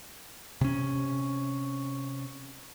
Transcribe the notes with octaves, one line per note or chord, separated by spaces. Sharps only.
C3 C#4